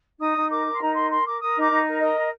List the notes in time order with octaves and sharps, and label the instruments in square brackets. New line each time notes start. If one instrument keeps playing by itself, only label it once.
[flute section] D#4 D#6
D#4
A#4 D6
A#4
C6
D#4 A#5
A#4 C6
A#4 C6
A#4 D6
A#4 D#6
D#4 D6
D#4
A#4
A#4 D#5
A#4